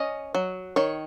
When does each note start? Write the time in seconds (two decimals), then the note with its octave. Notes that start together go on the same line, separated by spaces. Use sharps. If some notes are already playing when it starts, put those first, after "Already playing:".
Already playing: C#4 D#5
0.35 F#3
0.76 D#3 C#5